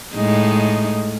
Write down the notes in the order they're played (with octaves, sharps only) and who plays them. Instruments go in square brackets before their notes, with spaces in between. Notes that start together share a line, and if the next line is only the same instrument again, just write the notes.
[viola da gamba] A2 G#3 D#4